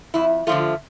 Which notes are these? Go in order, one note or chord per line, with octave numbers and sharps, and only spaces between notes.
F2 E4
D3 F3 A3 F4